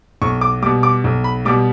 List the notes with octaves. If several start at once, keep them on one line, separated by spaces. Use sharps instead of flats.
B1 C#6
D6
B2 G3 D6
D6
B1
B5
B2 G3 D6